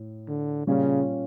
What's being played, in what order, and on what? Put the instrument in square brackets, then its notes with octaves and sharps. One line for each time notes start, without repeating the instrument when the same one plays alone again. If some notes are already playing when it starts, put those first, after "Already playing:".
Already playing: [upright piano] A2
[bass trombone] D3
[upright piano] A#2 G3 C#4 F4 [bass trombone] C#3